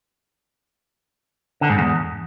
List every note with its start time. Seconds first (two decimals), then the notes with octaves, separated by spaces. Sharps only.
1.61 D3
1.70 G#2
1.78 E2